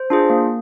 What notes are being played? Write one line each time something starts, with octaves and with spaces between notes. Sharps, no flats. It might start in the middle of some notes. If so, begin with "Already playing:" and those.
Already playing: C5
D4 F4 G#4
A#3